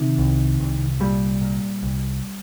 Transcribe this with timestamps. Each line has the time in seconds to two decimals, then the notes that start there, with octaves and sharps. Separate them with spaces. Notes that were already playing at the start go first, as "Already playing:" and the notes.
Already playing: C3 D#3
0.18 C2
0.60 C2
1.00 A#2 G3
1.41 A#2
1.83 C2